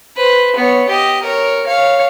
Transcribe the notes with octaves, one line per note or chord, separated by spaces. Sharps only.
B4 C5
B3 C#5
G4 D#5
A#4 C#5
C#5 F5